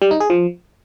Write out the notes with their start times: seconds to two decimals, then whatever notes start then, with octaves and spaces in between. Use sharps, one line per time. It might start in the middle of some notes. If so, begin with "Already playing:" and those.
0.02 G3
0.11 D#4
0.20 G#4
0.30 F3